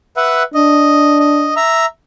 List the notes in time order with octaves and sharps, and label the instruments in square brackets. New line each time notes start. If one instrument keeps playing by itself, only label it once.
[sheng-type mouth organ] B4 E5 F#5
[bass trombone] D4 [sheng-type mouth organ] D#5
[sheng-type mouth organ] D#5
E5 A#5